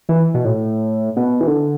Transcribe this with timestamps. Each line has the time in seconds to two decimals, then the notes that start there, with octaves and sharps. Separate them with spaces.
0.09 E3
0.34 B2
0.45 A2
1.17 B2
1.41 E3
1.47 D3